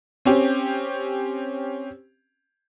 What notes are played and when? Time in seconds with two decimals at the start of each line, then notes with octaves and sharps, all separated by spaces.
0.25 C4 C#4 G4